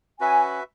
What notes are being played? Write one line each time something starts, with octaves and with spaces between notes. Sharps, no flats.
C#4 F#4 B4 E5 G#5